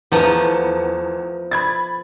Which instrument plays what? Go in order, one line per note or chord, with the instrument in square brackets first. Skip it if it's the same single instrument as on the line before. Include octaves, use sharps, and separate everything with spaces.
[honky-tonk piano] E2 A5 A#5 [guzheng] F3 A3 B3
[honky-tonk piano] B5 G#6 A6